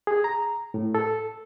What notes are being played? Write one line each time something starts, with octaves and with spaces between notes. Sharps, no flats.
G#4
A#5
A2
A4